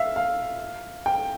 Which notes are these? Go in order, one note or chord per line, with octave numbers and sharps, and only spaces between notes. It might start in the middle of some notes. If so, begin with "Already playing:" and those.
Already playing: E5 F5
F5
G5